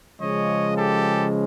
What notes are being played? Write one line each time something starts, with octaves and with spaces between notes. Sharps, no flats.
C#3 F3 G#3 C#4 C#5 D#5
G4 A4